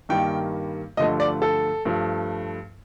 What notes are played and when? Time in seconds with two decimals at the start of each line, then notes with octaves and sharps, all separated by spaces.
0.09 G2 D#3 G3 A#3 G5
0.97 G2 D3 F3 A3 D#5
1.20 D5
1.42 A4
1.85 G2 F3 A3